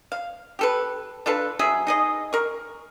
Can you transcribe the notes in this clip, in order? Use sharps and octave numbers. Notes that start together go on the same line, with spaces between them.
F5
G4 A4 B4
D4 F4 A4 B4
F#3 G#4 E5
D#4 G#4 D#5
A#4 C#6